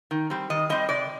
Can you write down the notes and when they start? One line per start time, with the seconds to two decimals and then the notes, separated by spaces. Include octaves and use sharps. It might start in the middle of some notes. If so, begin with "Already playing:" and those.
0.11 D#3
0.30 G3 C4
0.50 D#3 D#5
0.69 G3 C4 D#5
0.89 C3 D5